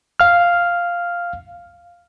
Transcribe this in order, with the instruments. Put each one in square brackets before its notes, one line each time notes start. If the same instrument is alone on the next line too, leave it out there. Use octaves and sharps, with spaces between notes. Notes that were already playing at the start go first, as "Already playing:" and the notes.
[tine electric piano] F5 F6